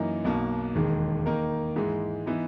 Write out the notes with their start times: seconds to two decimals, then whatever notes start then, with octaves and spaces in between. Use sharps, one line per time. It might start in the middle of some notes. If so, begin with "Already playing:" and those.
Already playing: F#2 E3 A#3 D#4
0.24 B1 B2 A#3
0.75 E1 D#2 D#3 G#3
1.26 D#3 A#3 D#4 A#4
1.76 G#2 E3 G#3
2.26 E3 B3 D#4